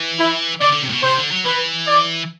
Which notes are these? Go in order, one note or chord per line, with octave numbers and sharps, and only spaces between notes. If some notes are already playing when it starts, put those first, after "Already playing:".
Already playing: E3
E4
D3 D5
D3
C3
A2
B2
C3 C5
D3
F#3
E3 B4
D5